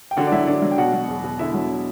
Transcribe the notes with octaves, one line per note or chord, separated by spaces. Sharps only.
G5
D3 F#4 F#5
D5
F#3 E4 E5
D3 D4 D5
F#3
G5
B2 F#4 F#5
F#3
E2
B2
D3 E4 E5
F#3